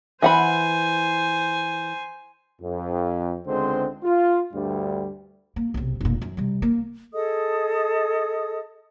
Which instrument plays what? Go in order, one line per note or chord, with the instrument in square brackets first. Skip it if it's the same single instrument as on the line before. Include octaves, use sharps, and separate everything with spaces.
[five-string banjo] E3 F#5 B5 [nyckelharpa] C5 G#5
[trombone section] F2
C#2 D3 G#3 C4 C5
F4
D2 G2 G3
[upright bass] A#3
B1 C3
F1 A#2
F#2 D#3
C3 G3
A#3
[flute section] G#4 A4 D#5 D#6